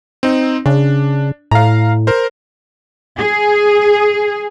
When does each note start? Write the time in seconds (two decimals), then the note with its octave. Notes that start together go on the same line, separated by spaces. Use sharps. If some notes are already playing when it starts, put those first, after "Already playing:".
0.23 C4 D#4
0.66 C#3 D4
1.51 A2 F5 A#5
2.07 A#4 C5
3.18 G#4